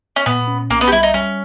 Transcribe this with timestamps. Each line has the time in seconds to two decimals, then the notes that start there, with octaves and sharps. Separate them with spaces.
0.16 C#4
0.26 A#2 B3
0.48 C#4
0.70 B1 A#3
0.81 B3
0.87 G4
0.92 G3 E4
1.03 D#4
1.14 G3 C#4